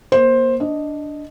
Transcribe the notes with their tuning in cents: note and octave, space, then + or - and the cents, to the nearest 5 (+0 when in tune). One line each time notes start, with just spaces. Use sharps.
A#3 +30 C5 +10
D4 +0 D#5 +0